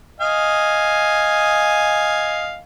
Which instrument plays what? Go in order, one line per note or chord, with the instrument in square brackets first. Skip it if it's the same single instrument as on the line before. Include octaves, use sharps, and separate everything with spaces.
[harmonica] D#5 F5 G#5